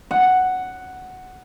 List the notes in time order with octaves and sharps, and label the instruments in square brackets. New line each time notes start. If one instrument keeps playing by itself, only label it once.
[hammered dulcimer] F#5